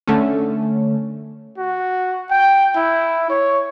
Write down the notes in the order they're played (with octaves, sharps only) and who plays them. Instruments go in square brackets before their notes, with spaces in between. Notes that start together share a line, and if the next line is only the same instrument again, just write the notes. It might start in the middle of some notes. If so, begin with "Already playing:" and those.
[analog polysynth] D3 A3 C#4
[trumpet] F#4
G5
E4
C#5